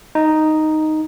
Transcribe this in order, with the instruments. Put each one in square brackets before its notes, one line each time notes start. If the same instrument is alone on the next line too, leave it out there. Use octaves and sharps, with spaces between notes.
[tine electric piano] D#4